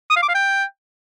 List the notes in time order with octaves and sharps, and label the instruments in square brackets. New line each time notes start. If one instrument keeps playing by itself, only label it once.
[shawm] D#6
F5
D6
F5
G5